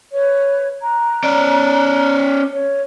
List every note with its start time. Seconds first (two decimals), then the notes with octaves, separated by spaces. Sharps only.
0.13 B4 C#5
0.82 A#5 F#6
1.24 C#4 D5
2.54 C#5